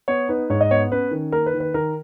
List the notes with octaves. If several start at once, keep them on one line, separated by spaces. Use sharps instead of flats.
B3 C#5
D#4 B4
G#2 C#5
D#5
B3 C#5
C#4 B4
D#3
A#3 A#4
B4
D#3
B4
D#3 A#4